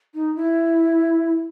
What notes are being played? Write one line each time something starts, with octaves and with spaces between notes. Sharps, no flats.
D#4
E4